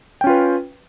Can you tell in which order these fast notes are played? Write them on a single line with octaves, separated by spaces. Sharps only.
G5 C#4 F4 B4